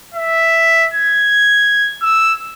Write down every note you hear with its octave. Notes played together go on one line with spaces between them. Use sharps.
E5
G#6
E6